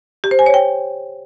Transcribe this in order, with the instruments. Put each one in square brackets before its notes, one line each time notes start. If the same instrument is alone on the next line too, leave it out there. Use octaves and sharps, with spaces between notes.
[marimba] G4
C5
G#5
C#5
G5